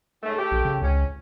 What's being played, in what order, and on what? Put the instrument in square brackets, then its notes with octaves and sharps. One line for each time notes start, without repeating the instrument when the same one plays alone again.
[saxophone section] G#2 C#3 A3
A3 G4
[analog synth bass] A#1
C#3
[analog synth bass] C#2 [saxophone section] C#4